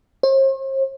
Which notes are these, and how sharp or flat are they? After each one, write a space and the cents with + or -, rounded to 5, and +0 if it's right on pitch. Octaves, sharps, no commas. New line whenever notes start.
C5 +45